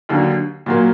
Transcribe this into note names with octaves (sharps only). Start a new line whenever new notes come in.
D#2 D3 F#3
A#2 F#3 A#3